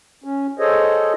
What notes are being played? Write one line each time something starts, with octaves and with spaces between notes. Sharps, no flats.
C#4
G#4 A4 C5 C#5 D#5